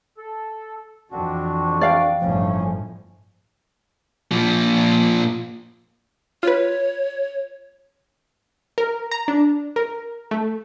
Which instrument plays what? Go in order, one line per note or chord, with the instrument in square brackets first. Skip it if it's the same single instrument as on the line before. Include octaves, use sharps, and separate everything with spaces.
[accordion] A4
[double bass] F2 E3 [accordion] C4 D4 F#4
[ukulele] D5 F5 G5
[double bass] G1 A2 [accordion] D2 C#4 [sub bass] F3
[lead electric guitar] A#2 F3
[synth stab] F4 B4 [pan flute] C#5
[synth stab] A#4
A#5
D4
A#4
A3